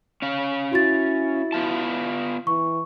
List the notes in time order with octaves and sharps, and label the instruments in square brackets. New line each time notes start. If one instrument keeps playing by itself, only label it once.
[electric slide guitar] C#4 F5
[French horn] E4 [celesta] F#4 A6
[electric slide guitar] B3 F4 A5
[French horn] E3 [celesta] C#6